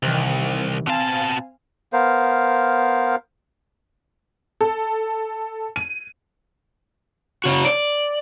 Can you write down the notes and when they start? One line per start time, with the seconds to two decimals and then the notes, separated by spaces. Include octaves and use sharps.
0.03 C2 C3 D#3 E3
0.87 B2 C4 F5 G#5 A5
1.93 B3 A#4 C5 F5
4.61 A4
5.76 D#7
7.44 C#3 F#4
7.65 D5